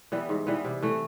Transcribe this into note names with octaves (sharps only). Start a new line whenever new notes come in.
E3 G3 B3
G#2
E3 G3 B3
C3
E3 A3